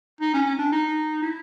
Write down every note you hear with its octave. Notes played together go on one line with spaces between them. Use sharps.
D#4
C#4
C#4
D4
D#4
E4